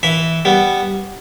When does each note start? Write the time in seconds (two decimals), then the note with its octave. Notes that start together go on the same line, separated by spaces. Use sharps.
0.03 E3 E5
0.45 G3 B3